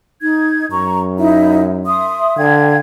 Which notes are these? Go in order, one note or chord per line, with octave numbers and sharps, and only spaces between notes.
D#4 G#6
F#2 A#5 C#6
D#4 E4 E5
E5 C6 D#6
D3 F5 G5 G#6